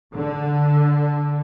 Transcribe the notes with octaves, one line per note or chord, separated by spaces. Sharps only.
D3